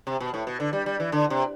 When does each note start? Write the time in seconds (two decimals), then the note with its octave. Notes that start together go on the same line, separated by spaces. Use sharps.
0.07 C3
0.20 B2
0.34 A2
0.47 B2
0.60 D3
0.73 G3
0.86 G3
1.00 E3
1.12 D3
1.30 C3